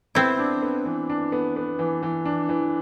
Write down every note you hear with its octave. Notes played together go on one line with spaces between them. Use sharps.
B3 C4 E4
D4
B3
E3
D4
B3
B3
E3
E3
D4
E3